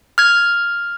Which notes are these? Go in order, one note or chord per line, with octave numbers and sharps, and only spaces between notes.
F6 G#6